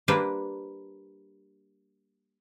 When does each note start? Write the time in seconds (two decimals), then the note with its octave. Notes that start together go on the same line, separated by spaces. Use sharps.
0.08 G3 A#3 D4 B4 C5